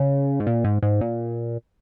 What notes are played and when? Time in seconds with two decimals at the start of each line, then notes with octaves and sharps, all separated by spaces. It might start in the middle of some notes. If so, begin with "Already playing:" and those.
Already playing: C#3
0.40 G#2
0.47 A#2
0.64 G#2
0.83 G#2
1.01 A#2